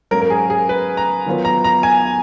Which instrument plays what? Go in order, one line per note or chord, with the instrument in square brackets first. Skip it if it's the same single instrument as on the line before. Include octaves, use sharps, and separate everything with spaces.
[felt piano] G#2 F#3 A#3 C#4 [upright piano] A#4
[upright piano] A#4
G#4
G#4
B4
A#5
[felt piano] D#3 F#3 B3 F4 B4
[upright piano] A#5
A#5
G#5